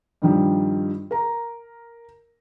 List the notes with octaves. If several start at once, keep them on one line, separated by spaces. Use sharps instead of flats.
G2 D#3 F3 G3
A#4 A#5